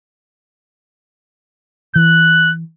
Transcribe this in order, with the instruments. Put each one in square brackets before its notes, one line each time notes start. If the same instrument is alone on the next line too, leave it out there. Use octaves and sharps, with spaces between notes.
[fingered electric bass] E3 [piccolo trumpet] F#6